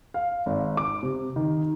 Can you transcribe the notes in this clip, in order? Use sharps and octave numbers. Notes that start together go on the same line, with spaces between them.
F5
G#1
D6
C3
D#3